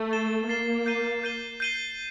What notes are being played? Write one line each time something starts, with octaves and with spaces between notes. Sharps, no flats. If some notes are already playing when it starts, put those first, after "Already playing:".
Already playing: A3
A6 C7 E7 G7
A#3 A6 C7 E7 G7
G6 C7 D#7 G7
G6 C7 D#7 G7
G6 C7 D#7 G7